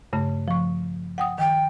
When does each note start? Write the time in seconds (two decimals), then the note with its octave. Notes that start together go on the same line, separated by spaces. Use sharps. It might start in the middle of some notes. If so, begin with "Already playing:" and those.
0.13 G2 C#3 A3
0.48 F3 C#6
1.18 F#5 G5 D#6
1.38 D#3 G5